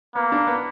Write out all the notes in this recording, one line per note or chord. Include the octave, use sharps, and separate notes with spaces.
A#3 B3
D4
B3